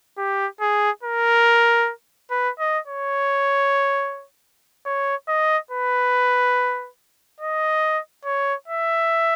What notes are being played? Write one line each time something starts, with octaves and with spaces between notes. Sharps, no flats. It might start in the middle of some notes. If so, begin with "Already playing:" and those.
G4
G#4
A#4
B4
D#5
C#5
C#5
D#5
B4
D#5
C#5
E5